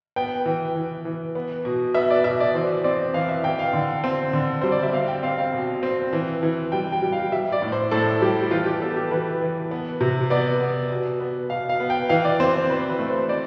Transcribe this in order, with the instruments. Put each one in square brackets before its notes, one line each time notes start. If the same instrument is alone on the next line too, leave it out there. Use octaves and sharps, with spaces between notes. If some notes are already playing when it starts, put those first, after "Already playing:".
[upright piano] B3 G5
E3
E3
E3
B3
B2
B3 E5
D5
B2 E5
D5
E3 C5
C4 D5
E3 F5
E5
E3 G5
F5
D3
C4
D3
G3 C5
D5
E5
C4 F5
G5
C4 F5
F5
B2
C4
E3
E3
G3 G5
G5
G3
F5
G3 E5
D5
A2
C5
A2 A4
G3 G4
E3 F4
G4
B3 A4
G4
E3 B4
E3
B3
C3
B3 D5
B3
B2
B3
B2 F5
F5
B3
G5
E3 F5
D5
C4 C5
C5
E3 B4
B4
A3
C5
C4 D5